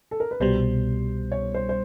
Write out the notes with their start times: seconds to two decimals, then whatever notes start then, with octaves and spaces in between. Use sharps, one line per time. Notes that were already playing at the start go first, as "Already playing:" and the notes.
0.11 A4
0.20 A#4
0.31 B4
0.40 C2 B2 G3 C5
1.32 C#5
1.54 C5
1.69 C5